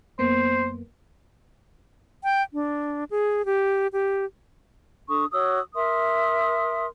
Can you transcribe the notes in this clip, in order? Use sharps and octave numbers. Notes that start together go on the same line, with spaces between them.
F#2 A#3 B3 C5
G5
D4
G#4
G4
G4
D4 A4 C#6 D#6
F#4 C#5 D#6 E6
A#4 E5 C6 D#6